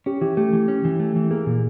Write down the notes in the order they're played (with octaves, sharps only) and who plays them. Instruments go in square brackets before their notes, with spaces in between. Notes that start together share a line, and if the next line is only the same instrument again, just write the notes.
[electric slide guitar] C#4 [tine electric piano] G4
[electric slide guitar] E3 [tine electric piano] G4
[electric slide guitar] A3 [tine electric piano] G4
[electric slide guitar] E3
C#4
E3
A3
E3
[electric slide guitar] A#3 [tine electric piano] G#4
[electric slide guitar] A#2